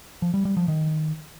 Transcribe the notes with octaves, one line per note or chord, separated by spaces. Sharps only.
F3
G3
G3
F3
D#3